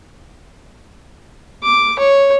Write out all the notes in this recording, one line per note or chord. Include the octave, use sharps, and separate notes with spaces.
D6
C#5